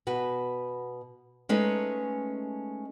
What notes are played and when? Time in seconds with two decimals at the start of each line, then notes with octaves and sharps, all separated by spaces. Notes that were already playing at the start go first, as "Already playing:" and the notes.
0.07 B2 F#4 B4
1.49 G#3 A3 C#4 D#4 A4 B4